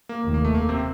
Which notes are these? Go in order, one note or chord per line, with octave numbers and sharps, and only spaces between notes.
A#3
F1 D#2 D#3
A#3
A3
A#3
C3 C4